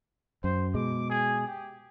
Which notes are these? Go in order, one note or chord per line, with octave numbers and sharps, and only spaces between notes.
F#2 C5
B2 G#3 D6
G#4
G4